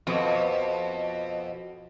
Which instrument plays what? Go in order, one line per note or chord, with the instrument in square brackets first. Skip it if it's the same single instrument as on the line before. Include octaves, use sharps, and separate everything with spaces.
[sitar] F2 B2